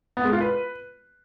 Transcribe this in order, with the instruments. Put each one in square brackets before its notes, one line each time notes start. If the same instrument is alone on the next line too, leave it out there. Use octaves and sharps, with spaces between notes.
[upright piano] B3
G#3
F4
B4